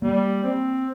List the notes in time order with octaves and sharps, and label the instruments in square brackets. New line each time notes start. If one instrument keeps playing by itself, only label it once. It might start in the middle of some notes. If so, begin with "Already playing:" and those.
[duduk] G3 [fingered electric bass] A#3
[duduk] C4